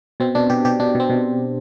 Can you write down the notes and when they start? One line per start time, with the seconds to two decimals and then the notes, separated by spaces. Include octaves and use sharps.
0.20 B2 C4
0.35 B2 D4
0.50 B2 G4
0.65 B2 G4
0.80 B2 D4
0.95 B2 C4
1.10 B2